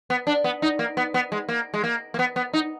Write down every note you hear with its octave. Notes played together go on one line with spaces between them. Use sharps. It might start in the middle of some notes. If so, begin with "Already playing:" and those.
B3
D4
B3
D#4
A#3
B3
B3
G#3
A#3
G#3
A#3
A#3
B3
B3
D#4